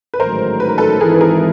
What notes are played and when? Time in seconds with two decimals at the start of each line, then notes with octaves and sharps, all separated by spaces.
0.14 B4
0.19 A1 G#2 D#3 F#3 A3 A#4 C5
0.60 B4
0.69 A#4
0.78 A4 B4
1.01 G#1 G#2 E3 G#4 A#4
1.14 B4
1.21 G#4 A#4